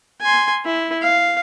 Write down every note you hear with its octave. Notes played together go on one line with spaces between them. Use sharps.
G#5 C6
E4
F5